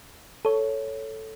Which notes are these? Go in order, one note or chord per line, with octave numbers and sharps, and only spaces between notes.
A4 C#5